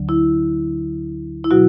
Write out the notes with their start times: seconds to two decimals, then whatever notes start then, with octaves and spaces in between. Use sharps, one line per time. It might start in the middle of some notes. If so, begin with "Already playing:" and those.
Already playing: D2 D3 F#3
0.09 E4
1.44 E4
1.51 B2 F#3 F#4